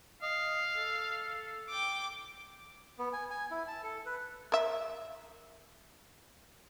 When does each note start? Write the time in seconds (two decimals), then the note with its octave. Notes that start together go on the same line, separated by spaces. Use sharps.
0.22 D#5 F5
0.77 A4
1.69 G5 D6
2.99 B3
3.13 G#5
3.30 G#5
3.51 E4
3.67 A5
3.83 A4
4.06 B4
4.52 A#4 E5